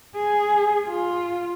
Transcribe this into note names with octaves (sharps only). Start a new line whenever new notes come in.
G#4
F4